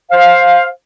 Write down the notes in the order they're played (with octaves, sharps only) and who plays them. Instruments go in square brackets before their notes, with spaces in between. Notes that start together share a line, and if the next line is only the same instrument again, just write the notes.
[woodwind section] C5 F5